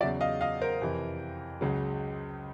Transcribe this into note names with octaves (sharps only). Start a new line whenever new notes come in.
E2 C#3 F#3 D5 E5
D#5 F5
D#5 F5
A#4 C5
F2 C3 E3
C#2 C#3 F#3